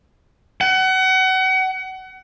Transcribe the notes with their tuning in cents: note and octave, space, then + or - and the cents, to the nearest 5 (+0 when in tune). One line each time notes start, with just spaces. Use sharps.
F#5 +30